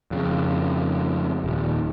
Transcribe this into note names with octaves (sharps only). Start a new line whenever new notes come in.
F2 C#3
D#1